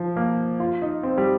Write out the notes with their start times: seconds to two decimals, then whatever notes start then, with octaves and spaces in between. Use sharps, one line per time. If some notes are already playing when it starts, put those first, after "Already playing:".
Already playing: F3
0.16 A#3
0.60 F4
0.82 D#4
1.03 C4
1.18 G3